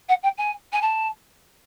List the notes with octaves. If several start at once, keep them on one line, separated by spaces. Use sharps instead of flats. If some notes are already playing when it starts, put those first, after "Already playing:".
F#5
G5
G#5
G#5
A5